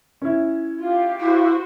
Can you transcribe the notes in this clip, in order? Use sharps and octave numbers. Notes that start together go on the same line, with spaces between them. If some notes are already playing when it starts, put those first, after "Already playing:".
C#4 E4
F4 G4 F5
E4 F#4 C5